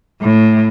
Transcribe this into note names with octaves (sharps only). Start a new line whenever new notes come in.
A2